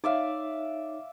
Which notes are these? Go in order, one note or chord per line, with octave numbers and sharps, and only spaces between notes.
D#4 C#5 D5 E5 F5